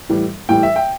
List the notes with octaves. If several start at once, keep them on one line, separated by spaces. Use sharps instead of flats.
A2 E3 G3
A2 E3 G3 G5
E5
G5